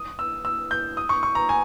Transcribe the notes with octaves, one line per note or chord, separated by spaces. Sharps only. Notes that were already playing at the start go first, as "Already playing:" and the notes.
Already playing: D#6
E6
E6
G6
D#6
C#6
C#6
A#5
G#5